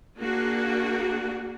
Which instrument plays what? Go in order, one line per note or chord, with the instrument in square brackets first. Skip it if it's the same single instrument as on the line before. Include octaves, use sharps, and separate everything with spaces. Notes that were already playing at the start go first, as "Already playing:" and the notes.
[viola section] A#3 D4 F#4 G#4